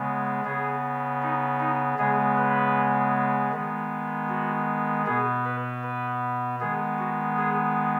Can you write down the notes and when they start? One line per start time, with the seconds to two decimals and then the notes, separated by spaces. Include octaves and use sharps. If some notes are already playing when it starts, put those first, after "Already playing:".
Already playing: C#3 G#3 B3
0.45 C#3 B3 G#4
1.22 D#4
1.60 D#4
1.98 C#3 G#3 B3 G#4
2.37 B4
3.52 D#3 G#3 B3
4.29 F#4
5.06 B2 B3 G#4
5.45 B4
5.83 B4
6.60 D#3 G#3 B3 G#4
6.99 F#4
7.38 G#4